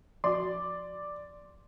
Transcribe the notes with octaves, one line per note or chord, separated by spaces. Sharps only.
F3 F#4 D5 C6